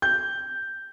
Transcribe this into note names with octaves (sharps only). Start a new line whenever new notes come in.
G6